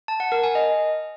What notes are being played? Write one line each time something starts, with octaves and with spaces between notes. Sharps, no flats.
A5
F#5
A#4
G#5
D#5